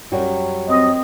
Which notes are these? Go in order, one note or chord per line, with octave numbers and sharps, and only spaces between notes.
F#2 F#3 G3
C4 D#5